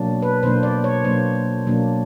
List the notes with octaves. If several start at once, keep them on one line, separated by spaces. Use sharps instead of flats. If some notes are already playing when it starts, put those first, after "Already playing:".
Already playing: B2 F#3 A#3 D4
B4
B2 F#3 A#3 D4 C5
D5
C#5
B2 F#3 A#3 D4 C5
B2 F#3 A#3 D4